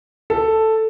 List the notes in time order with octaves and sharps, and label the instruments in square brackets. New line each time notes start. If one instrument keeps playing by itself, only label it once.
[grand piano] A4